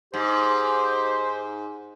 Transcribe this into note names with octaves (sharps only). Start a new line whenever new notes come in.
G#2 G4 C5